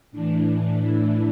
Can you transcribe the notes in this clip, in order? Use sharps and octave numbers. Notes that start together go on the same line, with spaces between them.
A2 E3 D4
E4